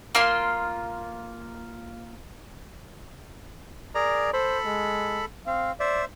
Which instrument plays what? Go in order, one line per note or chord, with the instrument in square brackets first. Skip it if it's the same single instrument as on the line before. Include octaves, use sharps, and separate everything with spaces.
[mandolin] A#3 F4 C6
[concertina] G#4 A#4 A#5 [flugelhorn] D5
[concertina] A4 B5 [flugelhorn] C5
[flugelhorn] G#3
[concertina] C4 [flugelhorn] F5
[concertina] C5 E5 [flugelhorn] D5